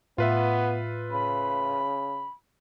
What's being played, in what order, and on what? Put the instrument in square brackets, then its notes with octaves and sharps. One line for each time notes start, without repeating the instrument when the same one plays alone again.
[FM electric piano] A2 [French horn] B3 [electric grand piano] F4 B4 E5
[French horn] C#3 [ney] B5